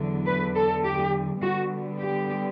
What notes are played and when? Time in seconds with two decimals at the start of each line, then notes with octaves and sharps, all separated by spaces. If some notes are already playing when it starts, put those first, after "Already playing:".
Already playing: E2 D3 F#3
0.26 B4
0.56 A4
0.84 G4
1.41 D3 G3 B3 F#4
1.99 G4